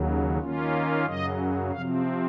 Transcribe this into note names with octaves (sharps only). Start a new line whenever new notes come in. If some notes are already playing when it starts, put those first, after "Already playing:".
Already playing: D#2 C#3 F#3
D#3 A#3 C#4 F4
F#2 C#3 F#3 D#5
C3 F3 C4 F5